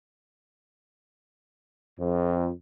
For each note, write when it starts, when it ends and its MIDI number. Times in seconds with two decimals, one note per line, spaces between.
2.00 2.50 41